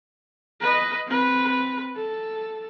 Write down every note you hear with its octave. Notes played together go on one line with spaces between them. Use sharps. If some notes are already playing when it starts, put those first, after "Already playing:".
B4 D#5
C4 B4
A4